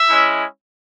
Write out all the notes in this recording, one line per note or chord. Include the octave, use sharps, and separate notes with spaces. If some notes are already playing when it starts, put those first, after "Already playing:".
Already playing: E5
G#3 C#4 E4